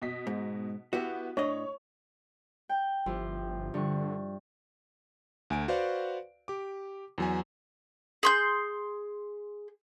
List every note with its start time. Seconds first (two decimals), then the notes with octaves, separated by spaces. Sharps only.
0.02 B2 D#5 B6
0.27 G#2
0.93 B3 E4 F#4 G4
1.37 A2 D4 C#5 D#5
2.69 G5
3.06 G1 F3 E4 G4
3.74 G2 D3 C#6
5.50 D2 G#5 D7
5.68 F#4 B4 C5 D5 F5 F#5
6.48 G4 D6
7.18 E2 F#3 G#5
8.23 G#4 C6 G6